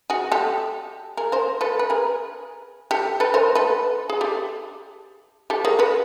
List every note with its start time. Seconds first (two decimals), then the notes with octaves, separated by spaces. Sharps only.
0.10 F#4 G#4
0.32 G4 A4
1.17 G#4 A#4
1.32 A#4 C5
1.61 A4 B4
1.79 B4
1.90 G#4 A#4
2.91 G4 A4
3.20 A4 B4
3.34 A#4 C5
3.55 A4 B4
4.10 G#4
4.21 G4 A4
5.50 G4 A4
5.65 G#4 A#4
5.79 A4 B4